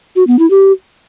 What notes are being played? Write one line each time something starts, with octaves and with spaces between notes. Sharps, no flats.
F#4
B3
E4
G4